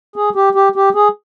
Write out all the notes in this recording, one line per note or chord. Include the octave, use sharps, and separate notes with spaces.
G#4
G4
G4
G4
G#4